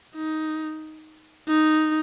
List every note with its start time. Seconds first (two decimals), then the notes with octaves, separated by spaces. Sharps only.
0.15 D#4
1.48 D#4